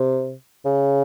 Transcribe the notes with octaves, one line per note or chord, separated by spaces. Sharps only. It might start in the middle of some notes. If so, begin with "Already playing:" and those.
Already playing: C3
C#3